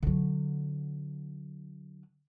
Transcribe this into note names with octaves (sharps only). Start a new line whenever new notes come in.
D3 F#3